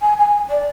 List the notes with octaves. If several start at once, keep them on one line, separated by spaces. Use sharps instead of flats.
G#5
G#5
D5